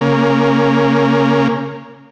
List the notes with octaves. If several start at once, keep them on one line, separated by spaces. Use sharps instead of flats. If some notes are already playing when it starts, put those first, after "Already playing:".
C#3 A#3